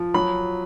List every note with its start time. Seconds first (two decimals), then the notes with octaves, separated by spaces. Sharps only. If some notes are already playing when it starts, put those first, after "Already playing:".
Already playing: F3
0.14 F#3 B5